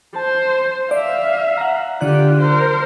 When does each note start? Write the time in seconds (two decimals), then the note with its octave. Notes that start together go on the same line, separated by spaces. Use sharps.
0.16 C5 A5
0.91 D5 E5 F5
1.58 F#5 A#5
2.01 D3 F4 G4 D5 F#6
2.41 A#4 C5